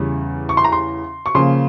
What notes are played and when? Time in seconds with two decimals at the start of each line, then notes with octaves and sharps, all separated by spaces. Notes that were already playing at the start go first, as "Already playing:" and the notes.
Already playing: E2 C#3 G3 C#4
0.49 C#6
0.57 C6
0.64 A#5
0.72 C6
1.26 C#6
1.35 C#3 F3 A#3 C6